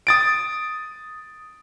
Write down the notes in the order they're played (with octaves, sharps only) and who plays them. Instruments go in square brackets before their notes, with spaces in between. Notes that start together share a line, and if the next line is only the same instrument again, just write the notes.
[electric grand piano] D#6 A6 D7